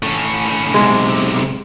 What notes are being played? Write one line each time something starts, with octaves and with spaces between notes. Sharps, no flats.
A2 C#4
B1 C3 G#3